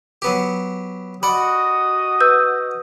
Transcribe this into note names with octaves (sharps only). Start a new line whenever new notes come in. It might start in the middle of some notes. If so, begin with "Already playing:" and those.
F#3 B3 G4
F#4 D5 D#5 F#5 B5 D#6
B4 E6 G6